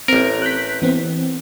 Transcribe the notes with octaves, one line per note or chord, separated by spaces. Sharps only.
A1 C4 A#4
F#6 G6 B6
E3 B3 C4